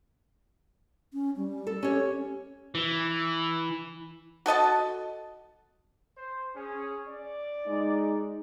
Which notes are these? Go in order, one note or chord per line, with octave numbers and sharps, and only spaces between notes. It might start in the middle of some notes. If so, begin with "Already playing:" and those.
C#4
G3
A4
C#4 G4 C#5
E3
F#4 A4 D#5 A5
C5
C#4 G#4
D5
G#3 D#4